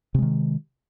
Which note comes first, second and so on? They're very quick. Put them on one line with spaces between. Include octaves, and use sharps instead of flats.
C3 G#3 D#3